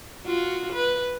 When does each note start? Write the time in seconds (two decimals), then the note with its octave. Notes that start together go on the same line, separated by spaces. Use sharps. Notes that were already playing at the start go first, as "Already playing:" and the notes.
0.24 F4 F#4
0.74 B4